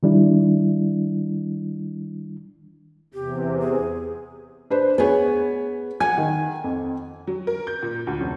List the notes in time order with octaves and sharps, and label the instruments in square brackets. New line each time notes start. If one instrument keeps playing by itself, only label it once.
[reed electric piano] D#3 G3 D4 E4
[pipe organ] E2 C3 [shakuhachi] G4
[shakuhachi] G#4
[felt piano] D4 B4 C5
[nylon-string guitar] B3 G#4 [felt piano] B4 C#5
[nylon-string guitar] F#5 G#5 [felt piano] G#6
[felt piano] D#3
F2
[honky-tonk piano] F#3
A#4
G6
A#2
D2
F1